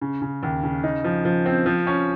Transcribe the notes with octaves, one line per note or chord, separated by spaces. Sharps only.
C#3
C#3
D#2
C#3
D#4
F3
F3
C4
F3
C#4